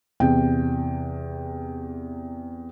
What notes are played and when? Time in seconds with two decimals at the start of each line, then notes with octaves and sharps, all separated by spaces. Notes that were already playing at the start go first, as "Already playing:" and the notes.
0.20 E2 C3 G5